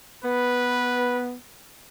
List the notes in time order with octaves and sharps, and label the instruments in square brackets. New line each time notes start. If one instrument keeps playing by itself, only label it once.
[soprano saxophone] B3 [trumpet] B4